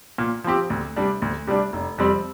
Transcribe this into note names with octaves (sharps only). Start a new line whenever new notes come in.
A#2
F3 C4 G4
D2
C3 G3 D4
D2
C3 G3 D4
F1
F2 C3 G3 C4